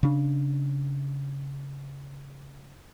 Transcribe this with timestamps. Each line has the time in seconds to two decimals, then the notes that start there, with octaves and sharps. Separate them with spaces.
0.03 C#3 D4